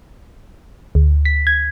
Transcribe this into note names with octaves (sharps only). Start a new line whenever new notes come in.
D2
B6
G#6